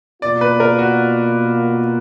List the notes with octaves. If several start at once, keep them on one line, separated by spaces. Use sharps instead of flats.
B2 A#3 F4 D5
B4
A#4
F#4